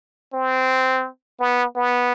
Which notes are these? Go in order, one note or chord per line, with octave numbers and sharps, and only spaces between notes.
C4
B3
B3